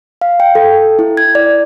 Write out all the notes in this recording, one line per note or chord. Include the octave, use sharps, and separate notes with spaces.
F5
G5
A4
E4
G#6
D5